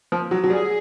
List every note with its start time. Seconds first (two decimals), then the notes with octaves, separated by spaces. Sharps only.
0.12 F3
0.31 F#3
0.44 F#3
0.50 G3 G#4